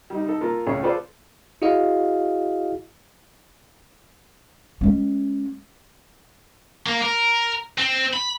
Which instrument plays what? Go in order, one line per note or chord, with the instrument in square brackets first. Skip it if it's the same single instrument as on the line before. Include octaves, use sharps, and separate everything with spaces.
[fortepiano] G3 D#4
D#4 A4
A#3 F4 A4 A#4
C#2 A2 A3 C#4 G#4 C#5
F4 G#4 A4 B4 C5 D5
[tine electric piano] E4 F#4 G#4 D#5 F5
[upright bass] G#3 C#4
[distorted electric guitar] A#3
A#4
C4
B5